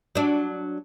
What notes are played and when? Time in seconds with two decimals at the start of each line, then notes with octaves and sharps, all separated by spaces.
0.15 F#3 D4